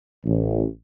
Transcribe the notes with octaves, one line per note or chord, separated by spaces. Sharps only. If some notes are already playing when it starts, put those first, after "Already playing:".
A1